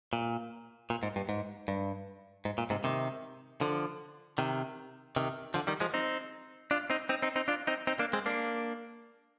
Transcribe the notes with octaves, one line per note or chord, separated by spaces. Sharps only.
A#2
A#2
G#2
G2
G#2
G2
G#2
A#2
G#2 C3
C3 D#3
D3 F3
C3 D#3
C3 D#3
D3 F3
D#3 G3
F3 G#3
C4 D#4
D4 F4
C4 D#4
C4 D#4
C4 D#4
C4 D#4
D4 F4
C4 D#4
C4 D#4
A#3 D4
G#3 C4
A#3 D4